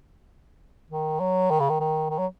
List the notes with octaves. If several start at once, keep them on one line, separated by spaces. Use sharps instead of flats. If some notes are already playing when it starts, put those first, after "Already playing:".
D#3
F#3
D#3
C#3
D#3
D#3
D#3
F#3